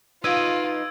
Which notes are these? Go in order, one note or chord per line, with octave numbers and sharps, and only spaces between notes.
D#4 F4 B4 D#5 E6 G#6 D7